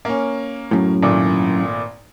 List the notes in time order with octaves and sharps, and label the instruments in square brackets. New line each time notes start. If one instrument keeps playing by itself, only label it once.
[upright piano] A#3 C#4
[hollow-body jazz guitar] F#2 A2
[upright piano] G#1 A#2 A3